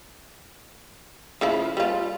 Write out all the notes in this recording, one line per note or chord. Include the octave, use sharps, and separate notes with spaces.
C#3 F3 E4
G3 F4